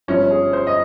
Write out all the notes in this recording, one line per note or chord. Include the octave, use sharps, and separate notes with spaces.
G1 G2 F3 C#4
G#4
C5
D#5